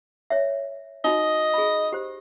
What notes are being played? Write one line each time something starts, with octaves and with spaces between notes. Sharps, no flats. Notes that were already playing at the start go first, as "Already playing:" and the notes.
C#5 E5
D#4 F#4 D#5
G#4 B5
G4 C5